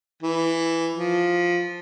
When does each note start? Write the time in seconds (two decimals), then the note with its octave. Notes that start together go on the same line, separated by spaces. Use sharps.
0.23 E3
0.95 F3